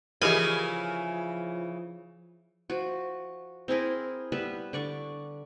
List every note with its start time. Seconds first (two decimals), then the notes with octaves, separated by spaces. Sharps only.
0.21 C#3 E3 F3 E4 G4 A#4 D#5 G#5
2.70 F3 F#4
3.68 C4 E4 G#4 A#4
4.32 G3 B3 B4 E5
4.73 D3 D5 C#6